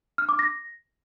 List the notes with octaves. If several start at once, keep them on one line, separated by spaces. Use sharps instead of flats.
F6
D6
A#6